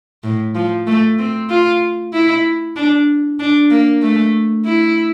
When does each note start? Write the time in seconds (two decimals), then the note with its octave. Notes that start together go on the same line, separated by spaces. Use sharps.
0.24 A2
0.55 F3
0.87 A3
1.19 C4
1.50 F4
2.13 E4
2.76 D4
3.40 D4
3.71 A#3
4.02 A3
4.66 E4